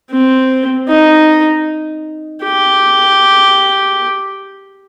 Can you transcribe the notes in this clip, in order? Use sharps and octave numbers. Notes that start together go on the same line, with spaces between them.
C4
D#4
G4